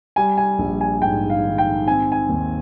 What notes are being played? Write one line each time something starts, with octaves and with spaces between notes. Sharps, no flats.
G3 G#5
G#5
A#1
G#5
G#2 G5
F5
D#3
G5
C4 G#5
G#5
D#2